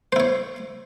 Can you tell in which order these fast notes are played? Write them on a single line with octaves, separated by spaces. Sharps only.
C5 E4 C#5